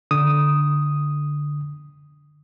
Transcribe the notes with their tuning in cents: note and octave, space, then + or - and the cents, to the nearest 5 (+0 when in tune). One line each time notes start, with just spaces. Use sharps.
D3 +0 D#6 +0